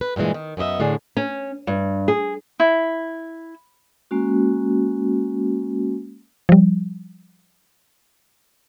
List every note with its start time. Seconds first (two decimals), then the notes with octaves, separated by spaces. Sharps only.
0.01 B4
0.16 G2 A#2 D#3 E3 G#3
0.34 D#3
0.57 F#2 B3 E4 D#5 E5
0.80 A2 D3 D4 G#4
1.17 C#4
1.67 G2
2.08 G#4
2.60 E4
4.11 G#3 A#3 C#4 F#4
6.49 F3 G3